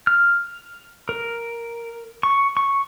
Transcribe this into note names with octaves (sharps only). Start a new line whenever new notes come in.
F6
A#4
C#6
C#6